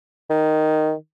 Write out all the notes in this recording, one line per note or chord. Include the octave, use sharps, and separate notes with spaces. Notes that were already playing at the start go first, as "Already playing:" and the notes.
D#3